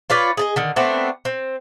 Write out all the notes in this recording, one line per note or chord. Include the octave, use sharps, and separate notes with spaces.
F4 B4 C#5 D5
G#4 D5 D#5
D3 D#3
A3 B3 C4 D4
C4